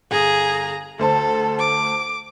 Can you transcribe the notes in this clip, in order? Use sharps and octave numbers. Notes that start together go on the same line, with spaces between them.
G1 G#4 A#5
D2 A4 C5 A5
D6